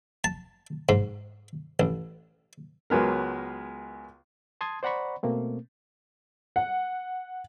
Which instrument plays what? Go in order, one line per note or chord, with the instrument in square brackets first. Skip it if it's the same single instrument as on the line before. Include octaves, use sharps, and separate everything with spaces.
[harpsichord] A5
G#2
A1
[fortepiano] C#2 F#3 G#3 B3 A#4
[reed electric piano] A5 C6 D#6 G#6
C5 D5 F#5 A#5 B5 C#6
B2 A3 A#3 C4
[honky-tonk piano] F#5